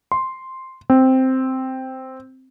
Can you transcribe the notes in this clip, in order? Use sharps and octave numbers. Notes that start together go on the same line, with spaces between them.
C6
C4